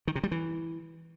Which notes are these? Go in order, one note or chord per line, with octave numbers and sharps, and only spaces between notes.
D#3
C3
G3
E3